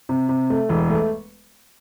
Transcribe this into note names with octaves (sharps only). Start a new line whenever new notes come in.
C3
C3
A3
E1
A3